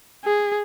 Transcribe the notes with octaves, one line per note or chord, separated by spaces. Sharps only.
G#4